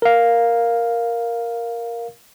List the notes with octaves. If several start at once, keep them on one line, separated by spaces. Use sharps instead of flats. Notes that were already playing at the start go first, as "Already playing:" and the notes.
A#4 F5